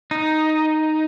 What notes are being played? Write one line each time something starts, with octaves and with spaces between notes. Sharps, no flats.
D#4